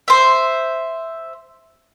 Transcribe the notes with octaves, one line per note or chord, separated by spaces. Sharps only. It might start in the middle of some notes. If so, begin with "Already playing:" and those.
C5 E5